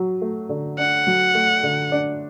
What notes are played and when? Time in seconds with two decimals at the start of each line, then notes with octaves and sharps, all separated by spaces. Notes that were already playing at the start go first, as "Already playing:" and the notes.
Already playing: F#3
0.22 A3
0.49 D3
0.78 D4 F#5
1.07 F#3
1.35 A3
1.63 D3
1.92 D4